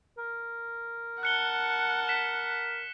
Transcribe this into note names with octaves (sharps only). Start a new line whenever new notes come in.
A#4
F#5 A5 F#6 C#7 G7
B6 E7